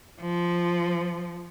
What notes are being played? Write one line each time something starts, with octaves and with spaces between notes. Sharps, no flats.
F3